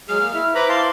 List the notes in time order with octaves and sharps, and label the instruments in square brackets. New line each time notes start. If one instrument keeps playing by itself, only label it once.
[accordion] F#3 G#3 G#4 [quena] F6
[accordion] A#3
E4 E5
[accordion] E4 C5 [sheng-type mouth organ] B4 A#5 B5 [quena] D6
[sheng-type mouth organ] F5 A5 C6